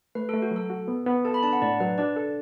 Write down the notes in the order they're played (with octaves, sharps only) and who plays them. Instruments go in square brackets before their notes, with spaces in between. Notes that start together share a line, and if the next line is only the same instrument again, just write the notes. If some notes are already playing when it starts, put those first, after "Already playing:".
[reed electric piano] A3 [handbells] B4
[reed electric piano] A3 [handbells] A4
[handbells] F#4
[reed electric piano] F#3
[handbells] A4
[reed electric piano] F#4
B3
B3
[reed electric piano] A4 [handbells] A5
[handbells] B5
[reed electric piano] D4 [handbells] A5
[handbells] F#5
[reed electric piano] A2 [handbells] D5
[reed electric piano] F#3 [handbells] B4
[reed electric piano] D4 [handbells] D5
[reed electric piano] A4